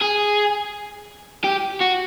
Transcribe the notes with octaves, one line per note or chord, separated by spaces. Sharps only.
G#4
G4
F#4